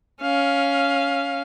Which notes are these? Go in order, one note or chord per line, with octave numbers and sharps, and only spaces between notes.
C#4 F5